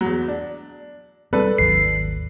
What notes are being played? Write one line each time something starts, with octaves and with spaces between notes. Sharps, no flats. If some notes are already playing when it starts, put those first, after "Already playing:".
E2 F#3
D4
G3 C4 D4 A4 B4
G#1 D#2 F#3 C7